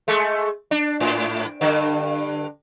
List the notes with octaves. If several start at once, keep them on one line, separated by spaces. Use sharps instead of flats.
G#3 A3
D4
G#2
G2 D3